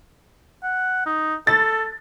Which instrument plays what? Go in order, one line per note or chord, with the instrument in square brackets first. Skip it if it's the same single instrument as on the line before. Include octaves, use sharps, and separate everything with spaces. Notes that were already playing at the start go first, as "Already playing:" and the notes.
[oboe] F#5
D#4
[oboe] A4 [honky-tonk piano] A6